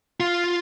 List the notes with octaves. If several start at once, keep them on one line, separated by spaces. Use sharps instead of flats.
F4